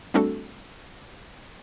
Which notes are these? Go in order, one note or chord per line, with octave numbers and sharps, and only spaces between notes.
G3 A3 C4 D4 F#4 A4